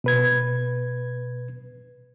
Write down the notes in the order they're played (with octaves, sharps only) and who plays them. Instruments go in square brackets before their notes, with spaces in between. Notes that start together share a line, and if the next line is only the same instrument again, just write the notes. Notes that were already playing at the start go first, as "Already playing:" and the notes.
[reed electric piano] B2 B4 G#6